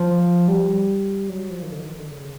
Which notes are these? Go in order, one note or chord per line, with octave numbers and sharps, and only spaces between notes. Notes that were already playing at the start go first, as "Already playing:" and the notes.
Already playing: F3
G3
F#3
F3
D#3
D3
E3
D#3
D3
C#3